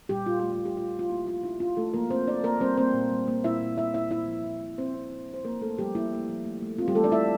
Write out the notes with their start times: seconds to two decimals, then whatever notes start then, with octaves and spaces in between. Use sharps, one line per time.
0.09 A#2 G3 G4
0.26 A#2 F4
0.39 A3 G4
0.52 F4
0.60 A#2
0.65 G4
0.77 A#2 F4
0.94 A#2
0.99 F4
1.10 A#3 E4
1.27 F3 F4
1.43 D4 E4
1.60 D4 F4
1.77 A3 D4 A4
1.93 F3 A#3 A#4
2.10 A#3 C4 C5
2.27 F3 D4 D5
2.44 A#3 A#4
2.60 G3 C4 C5
2.77 A#3 C4 C5
2.94 A#2
3.10 G3
3.28 A#3
3.44 A#2 E4 E5
3.61 A#2
3.78 A#2 E4 E5
3.94 A#2 E4 E5
4.11 A#2 E4 E5
4.27 F3
4.45 A#2
4.61 A#2
4.78 C4 C5
4.95 C4
5.11 D4
5.29 D4
5.34 C5
5.45 F3 A#3 A#4
5.61 A3 D4 A4
5.79 F3 G3 G4
5.95 A#3 E4
6.12 A#3
6.29 F3
6.45 A3
6.62 A3
6.78 C4 F4
6.88 G3 G4
6.95 E3 A3 A4
7.04 D4 D5
7.12 A3 E4 E5